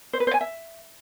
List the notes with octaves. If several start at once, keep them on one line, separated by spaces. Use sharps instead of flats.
C5
B4
C5
G#5
E5